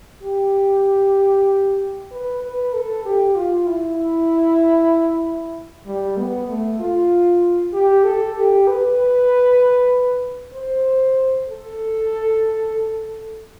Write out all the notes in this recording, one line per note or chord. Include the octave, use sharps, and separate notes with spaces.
G4
B4
B4
A4
G4
F4
E4
G3
B3
A3
F4
G4
A4
G4
B4
C5
A4